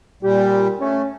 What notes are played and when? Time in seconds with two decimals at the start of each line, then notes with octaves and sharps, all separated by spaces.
0.23 A#2 G3 G4
0.80 A3 C#4